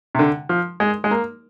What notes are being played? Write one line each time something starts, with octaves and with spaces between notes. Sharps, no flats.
C3
D3
F3
G#3
G#3
A#3